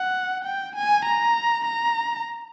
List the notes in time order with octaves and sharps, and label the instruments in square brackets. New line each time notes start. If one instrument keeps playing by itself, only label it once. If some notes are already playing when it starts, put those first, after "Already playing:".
Already playing: [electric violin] F#5
G5
G#5
A#5
A#5